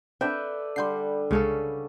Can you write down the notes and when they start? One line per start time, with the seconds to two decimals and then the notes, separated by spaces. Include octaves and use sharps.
0.21 C4 D4 A4 B4 D5 E5 G5
0.76 D3 G3 C6 G6 C7
1.31 C2 C#3 G#3 C#4 A4